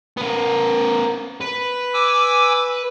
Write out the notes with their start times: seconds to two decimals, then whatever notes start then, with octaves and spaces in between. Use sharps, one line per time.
0.17 B3 A#4
1.41 B4
1.93 G#5 D6 E6